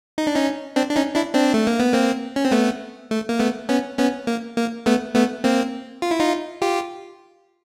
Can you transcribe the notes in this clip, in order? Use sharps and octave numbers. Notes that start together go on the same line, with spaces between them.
D#4
D4
C#4 D#4
C4 D4
D4
C#4 D#4
D4 E4
C4 D4
A3
A#3
B3
A#3 C4
C#4
C4
A3 B3
A3
A#3
A3 B3
B3 C#4
B3 C#4
A#3
A#3
A3 B3
A3 B3
A#3 C4
F4
E4
D#4 F4
F4 G4